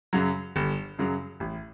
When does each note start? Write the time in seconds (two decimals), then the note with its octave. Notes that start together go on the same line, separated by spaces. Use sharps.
0.13 F#2 C#3 F#3
0.56 G1
0.99 F#2 C#3 F#3
1.40 A1